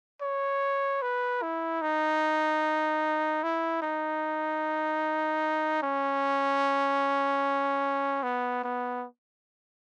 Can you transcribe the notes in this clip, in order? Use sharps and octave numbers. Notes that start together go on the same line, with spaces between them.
C#5
B4
E4
D#4
E4
D#4
C#4
B3
B3